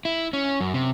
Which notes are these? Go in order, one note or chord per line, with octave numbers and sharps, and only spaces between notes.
E4
C#4
F#2
C3